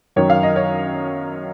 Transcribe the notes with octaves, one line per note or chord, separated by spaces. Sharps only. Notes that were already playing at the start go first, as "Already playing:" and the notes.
F#2 D#3 F#3 C#5
F5
D#5
C#5